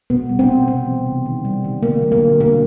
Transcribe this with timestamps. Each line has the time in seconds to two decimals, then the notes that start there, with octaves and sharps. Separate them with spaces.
0.10 B2 B3
0.29 G3
0.39 C4
0.49 B2
0.68 C3 C4
0.87 E3
1.06 C3
1.26 D#3
1.45 G3
1.64 D#3
1.83 D3 A#3
2.03 F#3
2.12 A#3
2.22 D3
2.40 B2 A#3